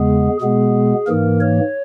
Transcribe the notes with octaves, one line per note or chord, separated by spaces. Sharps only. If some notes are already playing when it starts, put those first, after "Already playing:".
Already playing: E2 C#3 G#3 B3 G#4
B2 G#3 B3 G#4
G#2 E3 A#3 A#4
C#5